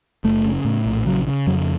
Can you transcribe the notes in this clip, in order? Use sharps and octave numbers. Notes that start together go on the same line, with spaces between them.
F#1 A3
C#3
A2
A#1
C#3 F#3
C#3
F2 F#3